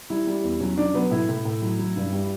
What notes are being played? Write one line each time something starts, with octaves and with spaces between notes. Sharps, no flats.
G3 E4
G3
E2
F#3 C#4
F#3 D4
F#3 B3
A2 E4
A2
A2
F#3
F#3
G2
G3